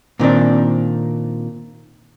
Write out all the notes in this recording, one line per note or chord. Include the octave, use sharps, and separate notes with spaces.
A#2 D#3 C4 D4